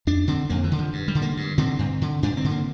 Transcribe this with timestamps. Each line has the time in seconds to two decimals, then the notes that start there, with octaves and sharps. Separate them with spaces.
0.07 F2 D4
0.28 D3 C4
0.49 F2 A#3
0.64 E3
0.72 D3
0.79 F3
0.93 G2
1.08 G3
1.15 D3
1.22 A#3
1.37 G2
1.58 D3 C4
1.79 G2
2.02 D3
2.23 G2 D4
2.37 C4
2.44 D3
2.51 A#3